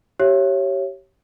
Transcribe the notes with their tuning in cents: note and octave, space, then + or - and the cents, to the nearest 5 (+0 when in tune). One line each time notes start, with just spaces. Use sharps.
G4 -25 C#5 -15 E5 +25